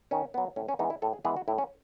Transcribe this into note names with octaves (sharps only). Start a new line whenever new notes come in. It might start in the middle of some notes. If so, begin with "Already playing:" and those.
D#3 C#4
F#3 B3
A2 C#4
C#4
E3 G#3 B3 D#4
E4
A2 A4
G#4
E3 G#3 B3 G#4
F#4
A2 E4
C#4